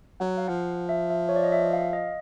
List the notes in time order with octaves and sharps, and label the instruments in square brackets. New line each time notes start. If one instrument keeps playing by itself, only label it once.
[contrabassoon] F#3 [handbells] F#5
[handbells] F5
[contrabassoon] F3 [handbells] F#5
[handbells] E5
E5
C#5
D5
D#5
E5
F5
D#5